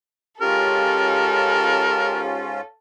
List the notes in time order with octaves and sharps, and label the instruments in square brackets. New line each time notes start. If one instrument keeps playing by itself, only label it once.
[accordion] G#2 C#4 F4 [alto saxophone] G4 [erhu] A4 [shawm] A#4